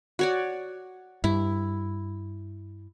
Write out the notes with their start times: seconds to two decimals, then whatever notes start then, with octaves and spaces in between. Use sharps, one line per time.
0.19 F#4 C#5 D5
1.24 G2 E4